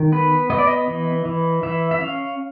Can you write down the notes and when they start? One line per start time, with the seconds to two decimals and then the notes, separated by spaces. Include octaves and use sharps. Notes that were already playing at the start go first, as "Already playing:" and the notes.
Already playing: D#3
0.12 B3 B4
0.50 B3 D#5
0.58 D5
0.67 D#5
0.88 E3
1.25 E3
1.63 E3 E5
1.91 E5
2.01 C#4 F5